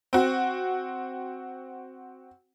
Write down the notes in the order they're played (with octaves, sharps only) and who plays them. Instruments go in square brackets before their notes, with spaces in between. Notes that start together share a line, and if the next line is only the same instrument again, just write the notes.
[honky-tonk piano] C4 F#4